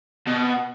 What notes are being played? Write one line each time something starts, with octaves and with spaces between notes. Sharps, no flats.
B2